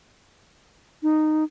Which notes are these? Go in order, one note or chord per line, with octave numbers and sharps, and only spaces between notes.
D#4